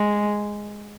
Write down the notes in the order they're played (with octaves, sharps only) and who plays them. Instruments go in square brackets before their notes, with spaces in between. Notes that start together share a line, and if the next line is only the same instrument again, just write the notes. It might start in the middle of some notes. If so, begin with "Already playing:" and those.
Already playing: [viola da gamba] G#3